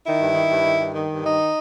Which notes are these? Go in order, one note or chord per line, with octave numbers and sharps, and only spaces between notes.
D#3 E4
G2
D#3
G2
D#3
G2
D#3
G2
D#3 D#4